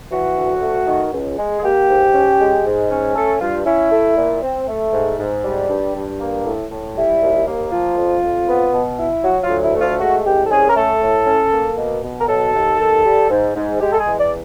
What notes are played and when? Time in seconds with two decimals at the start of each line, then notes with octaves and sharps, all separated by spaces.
0.11 E3 F#4
0.36 D2
0.61 A3
0.87 D#3
1.12 C#2
1.38 G#3
1.58 G#4
1.63 A#3 G4
1.89 G#2
2.14 C#4
2.39 G#3
2.65 G#2
2.90 C#4
3.15 A3 A4
3.41 G2 F4
3.66 C#4 E4
3.91 A3
4.17 A#2
4.42 C4
4.67 A3
4.93 G#2
5.18 G#2
5.44 G3
5.69 G2
5.95 G2
6.20 A#3
6.45 A2
6.70 A2
6.96 G3 E4
7.21 D#2
7.46 A#3
7.72 F3 F4
7.97 F2
8.22 F2
8.48 B3
8.73 B2
8.99 E4
9.24 F#3 F#4
9.43 F4
9.49 D2
9.63 E4
9.75 A3
9.81 F4
10.00 G#3 F#4
10.25 C2 G4
10.46 A4
10.51 C#4 G#4
10.69 A#4
10.76 A3 A4
11.02 A2
11.27 C#4
11.52 A#3
11.77 B2
12.03 B2
12.20 A#4
12.28 F#3 A4
12.54 D#2
12.79 D#2
13.04 G3
13.30 G#2
13.55 G#2
13.80 G#3 G4
13.92 A4
13.99 G#4
14.06 E2
14.19 D5